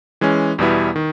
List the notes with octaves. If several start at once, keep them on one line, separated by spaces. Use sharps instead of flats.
E3 G#3 C#4
E2 B2 G3 B3 E4
D#3